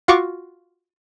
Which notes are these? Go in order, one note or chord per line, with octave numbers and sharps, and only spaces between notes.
F4 F#4 F5 C#6 D6